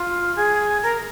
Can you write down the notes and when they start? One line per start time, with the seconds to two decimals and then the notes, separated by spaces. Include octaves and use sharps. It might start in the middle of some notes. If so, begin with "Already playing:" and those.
Already playing: F4
0.36 G#4
0.83 A#4